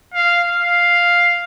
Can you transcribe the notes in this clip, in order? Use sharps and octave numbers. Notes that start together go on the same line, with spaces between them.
F5
F5